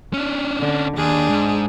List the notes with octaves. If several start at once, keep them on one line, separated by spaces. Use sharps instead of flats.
C#4 D4
D3
D#2 D4 G#4
G#2